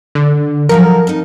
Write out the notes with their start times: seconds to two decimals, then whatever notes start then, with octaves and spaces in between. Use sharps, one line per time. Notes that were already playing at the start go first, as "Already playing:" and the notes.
0.15 D3
0.69 F3 F#3 A4 A#4
1.07 F2 D#4